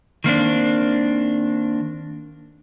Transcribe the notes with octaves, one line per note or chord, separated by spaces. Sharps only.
D#3 A#3 C4 D4